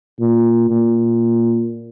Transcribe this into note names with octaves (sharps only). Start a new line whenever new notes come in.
A#2
A#2